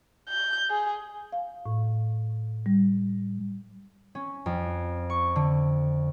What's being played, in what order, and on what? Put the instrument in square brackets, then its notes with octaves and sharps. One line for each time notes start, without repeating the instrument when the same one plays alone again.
[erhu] G6
G#4
[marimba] F5
A2
G3
[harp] C#4
F2
C#6
D3